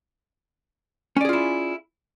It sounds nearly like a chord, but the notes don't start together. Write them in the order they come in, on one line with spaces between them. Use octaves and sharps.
C#4 D5 G#4 F4 E4